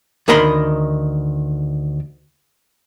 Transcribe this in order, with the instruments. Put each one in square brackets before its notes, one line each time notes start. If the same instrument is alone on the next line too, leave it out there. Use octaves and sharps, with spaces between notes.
[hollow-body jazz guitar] D2 D#3 A#4 D#5 B5 C6